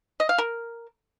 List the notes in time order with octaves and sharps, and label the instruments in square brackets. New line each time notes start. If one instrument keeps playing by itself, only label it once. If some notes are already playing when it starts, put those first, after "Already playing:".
[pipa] D#5
F5
A#4